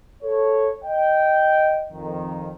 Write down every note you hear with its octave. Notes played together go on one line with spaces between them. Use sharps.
A4 C#5
D#5 G5
F2 D#3